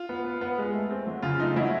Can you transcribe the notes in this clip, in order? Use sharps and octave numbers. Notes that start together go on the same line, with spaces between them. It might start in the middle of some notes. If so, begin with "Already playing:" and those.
Already playing: F4
B3
B3
B3
G#3
A3
C4
F#3
C#3 F4
A3 D#4
F#3 E4